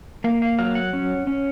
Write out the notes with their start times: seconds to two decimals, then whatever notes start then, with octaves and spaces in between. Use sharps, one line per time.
0.24 A#3 F5
0.42 F5
0.59 F#3 F5
0.75 F#5
0.93 C#4
1.27 C#4